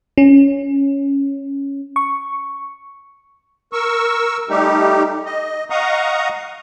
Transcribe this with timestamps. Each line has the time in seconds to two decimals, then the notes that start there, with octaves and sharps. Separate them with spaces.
0.18 C#4
1.96 C#6
3.73 A#4 C#6 E6
4.49 G3 A3 D#4 G4
5.26 D#5
5.70 D#5 F5 F#5 A#5 C#6 D#6